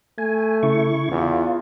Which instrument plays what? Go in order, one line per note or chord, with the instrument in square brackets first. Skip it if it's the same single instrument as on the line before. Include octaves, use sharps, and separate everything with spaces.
[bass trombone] A3 [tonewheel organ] G#5
[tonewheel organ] C#3 E4 C#6
[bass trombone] E2 [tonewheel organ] F4